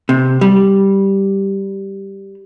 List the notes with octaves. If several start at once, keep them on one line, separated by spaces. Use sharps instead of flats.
C3
G3